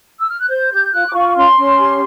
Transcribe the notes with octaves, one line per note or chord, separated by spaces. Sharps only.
E6
F6
F#6
C5 G6
G4 G6
F4 F#6
D6
F4 C#6
C#4 C6
C#4
G4